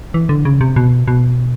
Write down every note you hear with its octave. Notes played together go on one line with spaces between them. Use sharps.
E3
D3
C#3
C3
B2
B2